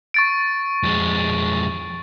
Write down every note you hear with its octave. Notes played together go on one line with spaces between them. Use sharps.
C#6 A6 D7
F2 G#3